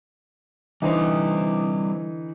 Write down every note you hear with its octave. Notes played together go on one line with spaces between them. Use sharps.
D3 E3 G3 D#4 C5